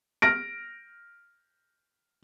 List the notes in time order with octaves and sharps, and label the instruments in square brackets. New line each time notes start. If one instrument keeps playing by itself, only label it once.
[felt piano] F6 A#6 D7